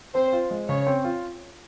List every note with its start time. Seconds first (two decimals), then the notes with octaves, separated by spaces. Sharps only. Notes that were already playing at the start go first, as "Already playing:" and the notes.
0.14 C4 C5
0.33 F4
0.51 G#3
0.68 C#3 C#5
0.87 C4
1.04 F4